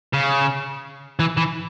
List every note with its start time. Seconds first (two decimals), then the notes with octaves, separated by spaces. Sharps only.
0.14 C#3
1.20 E3
1.37 E3